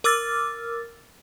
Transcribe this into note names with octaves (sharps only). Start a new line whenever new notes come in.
A#4 D6 E6 F6 A6